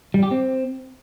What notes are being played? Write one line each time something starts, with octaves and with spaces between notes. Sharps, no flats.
G3
G4
C4